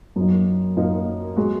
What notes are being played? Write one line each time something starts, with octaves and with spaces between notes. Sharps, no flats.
F#2 F#3 A#3 D#4
F#2 F#3 A#3 D#4
G#3 F#4